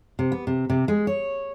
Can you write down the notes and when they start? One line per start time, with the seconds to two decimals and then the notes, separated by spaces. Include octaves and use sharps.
0.19 C3
0.32 B3
0.47 C3
0.70 C3
0.88 G#3
1.07 C#5